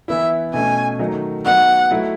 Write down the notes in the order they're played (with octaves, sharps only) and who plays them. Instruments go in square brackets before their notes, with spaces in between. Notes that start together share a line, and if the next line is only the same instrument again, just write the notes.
[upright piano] E3 B3 E4 [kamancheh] E5
[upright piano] B2 A3 C#4 [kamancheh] G#5
[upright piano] D#3 F#3 A3 D#4
[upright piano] F#3 B3 D#4 [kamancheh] F#5
[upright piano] F#3 A3 E4